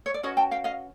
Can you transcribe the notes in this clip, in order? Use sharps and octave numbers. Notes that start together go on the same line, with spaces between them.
C#5
D5
C#4 F#4 B4 C#5 D#5
G5 A5
F5 G5
D#5 F5